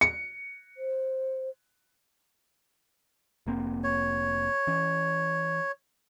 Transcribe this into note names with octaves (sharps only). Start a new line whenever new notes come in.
C#7
C5
F1 A#3 C4
C#5
E3 C#4